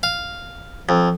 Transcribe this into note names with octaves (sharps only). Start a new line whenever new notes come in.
F5
F2